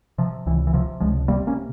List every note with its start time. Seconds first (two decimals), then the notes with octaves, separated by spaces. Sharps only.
0.18 C3 F3
0.46 C#2 E3
0.67 E3
0.74 C3 F3
1.00 C#2 F3 G#3
1.28 C3 G3 A#3
1.47 A#3 C#4